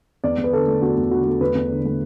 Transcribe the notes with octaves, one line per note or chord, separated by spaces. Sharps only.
E2 D5
E2
B4
D3 A4
A3
E2 F#4
E2
D3 F#4
A3
E2 B4
E2
D3
A3